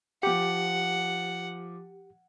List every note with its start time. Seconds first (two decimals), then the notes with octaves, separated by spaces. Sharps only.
0.23 F3 G4 F#5 D6 C#7